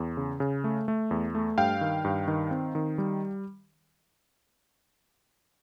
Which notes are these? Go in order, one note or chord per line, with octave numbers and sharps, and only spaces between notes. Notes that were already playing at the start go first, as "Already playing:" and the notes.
Already playing: E2
C#3
C#3
A3
A3
E2
A3
G2 F5 G5
D#3
G2
D#3
C4
D#3
G3